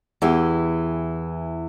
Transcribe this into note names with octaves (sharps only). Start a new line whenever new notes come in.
E2 E3 G4